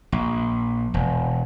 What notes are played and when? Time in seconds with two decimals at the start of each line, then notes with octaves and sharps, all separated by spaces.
0.12 A#1
0.94 E1